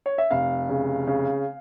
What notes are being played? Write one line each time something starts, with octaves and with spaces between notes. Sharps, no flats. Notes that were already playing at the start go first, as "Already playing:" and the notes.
C#5
E5
F1 F5
C#3
C#3